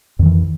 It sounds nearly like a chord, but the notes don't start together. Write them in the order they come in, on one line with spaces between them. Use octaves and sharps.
F2 D#3 E3